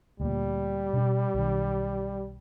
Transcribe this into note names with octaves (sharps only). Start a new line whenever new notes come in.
D2 A#2 G3
B2 D4
B1 D#3